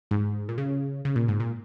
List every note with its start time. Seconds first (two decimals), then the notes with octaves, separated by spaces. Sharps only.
0.11 G#2
0.49 A#2
0.58 C#3
1.05 C#3
1.16 A#2
1.28 G#2
1.40 A#2